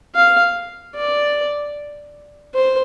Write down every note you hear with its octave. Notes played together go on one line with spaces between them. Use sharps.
F5
D5
C5